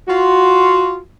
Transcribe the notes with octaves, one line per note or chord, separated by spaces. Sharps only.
F4 F#4